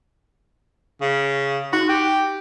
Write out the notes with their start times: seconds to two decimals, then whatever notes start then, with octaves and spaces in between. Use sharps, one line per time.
1.01 C#3
1.73 D#4 F#4
1.89 G4 G5